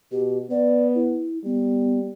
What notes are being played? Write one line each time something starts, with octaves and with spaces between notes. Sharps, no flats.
B2 G4
B3 D5
E4
G3 B3